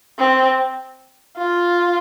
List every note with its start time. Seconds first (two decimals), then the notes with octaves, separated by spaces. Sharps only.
0.19 C4
1.38 F4